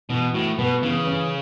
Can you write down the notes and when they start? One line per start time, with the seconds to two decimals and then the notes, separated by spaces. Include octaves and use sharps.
0.10 B2 E3
0.34 A2 F#4
0.58 B2 B3
0.83 C#3 E3
1.07 C#4